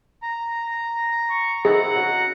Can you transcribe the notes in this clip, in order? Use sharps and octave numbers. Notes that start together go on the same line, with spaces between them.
A#5
C#6
D#3 C4 E4 G#4 F#5
C#3 F#4